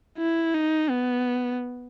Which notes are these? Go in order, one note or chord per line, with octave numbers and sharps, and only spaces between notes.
E4
D#4
B3